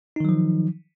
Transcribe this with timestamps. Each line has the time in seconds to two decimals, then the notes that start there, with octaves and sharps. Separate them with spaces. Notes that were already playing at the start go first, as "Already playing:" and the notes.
0.16 D#4
0.20 D#3
0.25 F#3
0.29 F3